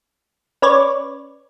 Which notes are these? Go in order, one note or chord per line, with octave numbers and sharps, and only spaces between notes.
C#4 B4 C#5 D5